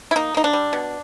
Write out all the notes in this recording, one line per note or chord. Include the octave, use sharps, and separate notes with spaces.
E4
A#3 D#4
A#3 D#4
D4
G3
B2